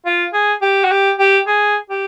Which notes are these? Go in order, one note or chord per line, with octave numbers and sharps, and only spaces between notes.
F4
G#4
G4
F#4
G4
G4
G#4
G4